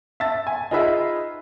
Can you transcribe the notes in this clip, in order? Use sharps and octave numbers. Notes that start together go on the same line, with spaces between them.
E5 A5 A6
G#5
D#4 F4 G#4 B4 E5